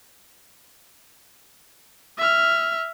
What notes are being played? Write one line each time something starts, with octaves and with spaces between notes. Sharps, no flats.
E5 F6